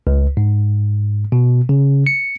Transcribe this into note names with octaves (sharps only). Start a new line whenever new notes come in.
C#2
G#2
B2
C#3
C#7